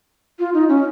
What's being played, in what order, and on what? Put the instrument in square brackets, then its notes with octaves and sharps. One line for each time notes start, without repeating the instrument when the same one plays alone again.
[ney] F4
D#4
C#4